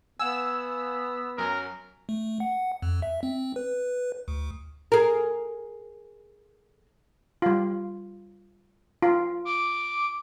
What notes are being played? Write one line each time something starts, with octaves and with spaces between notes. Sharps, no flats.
B3 F5 F#5 G#5 E6
F#2 F#3 A#4 G#5
A3
F#5
F2
E5
C4
B4
D2
G#4 A#4
G3 F4
F4
D6